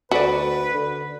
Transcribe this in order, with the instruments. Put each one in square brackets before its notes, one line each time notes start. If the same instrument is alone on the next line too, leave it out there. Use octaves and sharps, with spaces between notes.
[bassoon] D2 [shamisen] F#4 D5 [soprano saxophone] B4
[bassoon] D3